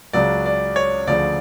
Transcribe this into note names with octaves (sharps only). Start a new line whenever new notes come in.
C#2 C#3 F#3 D5
D5
C#5
D2 C#3 F3 D5